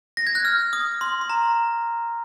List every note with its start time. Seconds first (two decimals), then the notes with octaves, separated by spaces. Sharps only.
0.17 A#6
0.27 G#6
0.35 F#6
0.45 F6
0.73 D#6
1.01 C6
1.21 C6
1.30 A#5